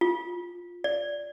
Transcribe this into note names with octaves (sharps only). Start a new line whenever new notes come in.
F4
D5